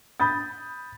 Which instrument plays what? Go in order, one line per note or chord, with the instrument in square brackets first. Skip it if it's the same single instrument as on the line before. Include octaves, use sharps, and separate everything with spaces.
[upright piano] B5 D#6 G6 A6